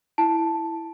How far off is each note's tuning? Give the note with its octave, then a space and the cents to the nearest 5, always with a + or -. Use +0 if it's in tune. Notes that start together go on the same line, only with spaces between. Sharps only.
E4 +0 A5 +0